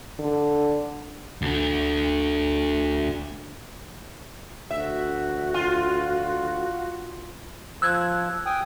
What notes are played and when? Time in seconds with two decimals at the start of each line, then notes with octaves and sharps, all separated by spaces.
0.19 D3
1.42 D2 D3
4.71 D2 F#4 E5
5.54 F4
7.82 F3 E6 F#6 G#6
8.46 G5 G#5 D#6